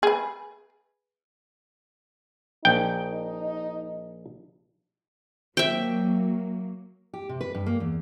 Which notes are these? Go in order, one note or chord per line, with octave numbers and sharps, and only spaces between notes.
G#4 B4
A#1 D#4 G5
F#3 A#3 E5 G5
G4
C3
B4
G2
A#3
E2